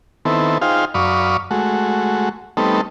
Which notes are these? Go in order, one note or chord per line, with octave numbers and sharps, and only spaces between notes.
D#3 B3 C4 E4 A4
D#4 F4 G#4 C5 F5 G5
F#2 D5 F5 B5 C#6 D#6
G#3 A3 F#4
G3 A3 B3 C4 D#4 A4